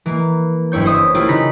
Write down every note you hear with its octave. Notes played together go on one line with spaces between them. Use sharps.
E3 A#3
F#1 G2 E4 C#5 G6
C5 C#5 E5 D#6
A#3 E4 F4 G4
C#3 D#4 B5 A#6 B6